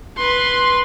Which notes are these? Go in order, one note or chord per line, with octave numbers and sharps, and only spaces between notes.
B4 C6